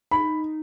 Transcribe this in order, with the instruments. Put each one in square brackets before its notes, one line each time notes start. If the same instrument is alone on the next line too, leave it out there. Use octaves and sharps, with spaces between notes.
[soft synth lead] D#4 [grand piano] B5